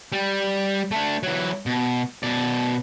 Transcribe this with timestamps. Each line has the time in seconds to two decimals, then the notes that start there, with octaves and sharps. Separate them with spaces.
0.12 G3
0.91 A3 D4
1.23 E3 F#3
1.66 B2
2.23 B2 D5